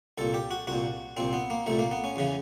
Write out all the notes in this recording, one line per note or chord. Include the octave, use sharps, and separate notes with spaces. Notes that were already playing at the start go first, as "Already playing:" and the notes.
C2 A#2 A4
G4
F#4
C2 A#2 F#4
C2 A#2 C4
B3
A#3
C2 A#2 A3
A#3
B3
C#4
E2 C#3 E3